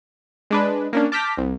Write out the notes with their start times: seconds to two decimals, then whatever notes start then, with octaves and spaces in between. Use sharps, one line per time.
0.51 G#3 D4 B4
0.93 A#3 C#4 D4
1.12 A5 D6 F6 G6 A#6 B6
1.38 C2